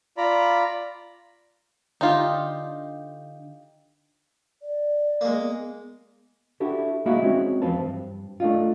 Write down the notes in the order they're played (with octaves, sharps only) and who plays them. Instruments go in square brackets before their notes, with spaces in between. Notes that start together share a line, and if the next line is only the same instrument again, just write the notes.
[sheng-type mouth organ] F4 D5 A#5 B5
[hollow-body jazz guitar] D3 [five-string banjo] D#4 F4 G4
[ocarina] D5
[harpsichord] G#3 A#3
[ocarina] B3
[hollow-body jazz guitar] D4 E4 F#4 G4 A4
G3 A#3 D#4 E4 F#4 G#4
G#3 C4 C#4 D#4 F#4
E2 F3 C4 F4 B4 A5
G2
A3 D4 D#4 F4